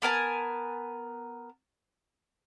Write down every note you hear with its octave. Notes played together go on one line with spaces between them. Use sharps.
B3 A#4 G#5 A5